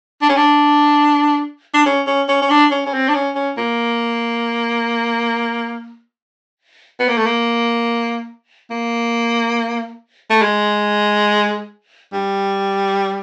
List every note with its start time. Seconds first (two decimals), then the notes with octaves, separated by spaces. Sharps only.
0.22 D4
0.29 C#4
0.37 D4
1.74 D4
1.86 C#4
2.07 C#4
2.29 C#4
2.42 C#4
2.50 D4
2.71 C#4
2.86 C#4
2.93 C4
3.08 D4
3.14 C#4
3.35 C#4
3.57 A#3
7.00 B3
7.09 A#3
7.17 A3
7.26 A#3
8.70 A#3
10.30 A3
10.42 G#3
12.13 G3